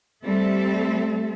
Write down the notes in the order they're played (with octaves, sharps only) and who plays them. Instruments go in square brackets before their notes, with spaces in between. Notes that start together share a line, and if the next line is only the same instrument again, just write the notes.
[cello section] G3 A3 C4 A4 E5